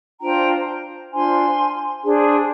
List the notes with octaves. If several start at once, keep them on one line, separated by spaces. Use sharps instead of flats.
D4 F4 C5 G5 A#5
D4 F4 C5 G#5 C6
D4 G#4 C5